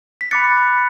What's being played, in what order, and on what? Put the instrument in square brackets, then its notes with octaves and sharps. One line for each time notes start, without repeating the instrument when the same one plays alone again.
[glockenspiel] B6
B5 D6 F#6 A6 C#7